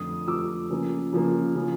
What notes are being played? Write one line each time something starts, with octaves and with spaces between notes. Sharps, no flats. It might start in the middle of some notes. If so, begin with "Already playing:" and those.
Already playing: F2 D3 F3 A3 D#6
F2 D3 F3 A3 D6 E6
C#3 F3 A#3
C#3 F3 A#3
C#3 F3